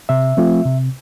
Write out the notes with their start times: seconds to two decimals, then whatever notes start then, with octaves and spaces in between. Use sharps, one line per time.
0.09 C3 E5
0.37 F3 A3 C4 F4
0.65 C3